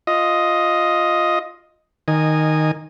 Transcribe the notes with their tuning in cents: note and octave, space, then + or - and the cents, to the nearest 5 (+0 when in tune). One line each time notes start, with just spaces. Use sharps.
F4 +0 D#5 +5
D#3 +0 D#5 -15 G#5 -10